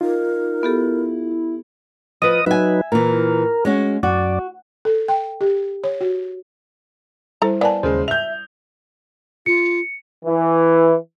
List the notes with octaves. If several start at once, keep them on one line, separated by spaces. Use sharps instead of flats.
D#4 F4 A#4
B3 E4 G4 A4
F3 B4 D#5 D#6
F#3 D#4 B4 E5 G#5
A#2 E3 A#4
G#3 C#4 F#4
F#2 F#4 D5
A4
G5
G4
C#5
F#4
G3 E4 A4 C5 A#5
A#3 B3 D5 G#5 A5
D#2 C#3 G#3 C5
E5 G6 F7
F4 C#7
E3